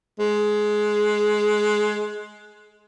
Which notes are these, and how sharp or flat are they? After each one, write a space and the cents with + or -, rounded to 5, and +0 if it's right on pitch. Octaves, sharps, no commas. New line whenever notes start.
G#3 +15